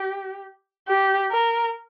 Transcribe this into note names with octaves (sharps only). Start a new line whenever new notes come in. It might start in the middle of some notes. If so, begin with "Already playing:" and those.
Already playing: G4
G4
A#4